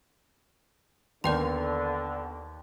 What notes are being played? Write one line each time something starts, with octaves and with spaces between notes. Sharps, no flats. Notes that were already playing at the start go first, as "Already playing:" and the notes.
D#2 D3 B3 A#4 D5 G5 C6